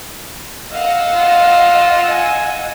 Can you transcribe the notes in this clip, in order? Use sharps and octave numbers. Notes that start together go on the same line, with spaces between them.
D#5 F5 F#5 E6
F4
G#5